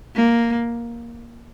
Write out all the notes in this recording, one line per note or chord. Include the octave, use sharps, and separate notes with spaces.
A#3